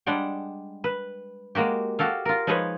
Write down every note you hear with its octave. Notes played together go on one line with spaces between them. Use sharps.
G3 G#3 D4 F#5 G5
B4
G#3 A#3 F#4 G4
F#4 G4 A4 F5
F4 A#4
F3 G#3 D#4 G#4 B4 C#5